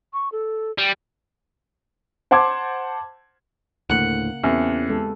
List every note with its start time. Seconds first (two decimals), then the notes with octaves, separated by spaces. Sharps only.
0.13 C#6
0.32 A4
0.78 G3
2.31 C5 F#5 A5 C6 D6 G#6
3.90 D2 A2 C#3 A#3 F#5
4.44 E2 C4 C#4 G4 A4
4.89 G#3 A4